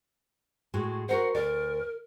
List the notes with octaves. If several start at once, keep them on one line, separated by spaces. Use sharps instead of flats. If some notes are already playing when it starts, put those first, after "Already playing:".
A2 G#3 F#4
F#4 A#4 C5 F#5
D2 A#4 D5